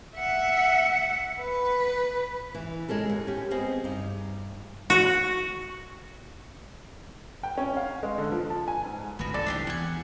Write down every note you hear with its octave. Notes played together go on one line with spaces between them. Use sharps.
E5 F#5
B4
E3
G#3 C#4 A4 A#4
D#2
C#4 G4
B3 C4 G#4 D#5
G2 D#4
F#4
G5
C#4
F5
G#3
D3
F3
A5
G#5
G#2
G#1 D2 D3 B3 F#4
C2 G#2 E3 A4 D5
D4 F#4 G4
E2 F#5 G#5